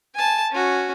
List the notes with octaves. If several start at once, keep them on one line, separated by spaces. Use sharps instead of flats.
G#5 A5
C#4 F#4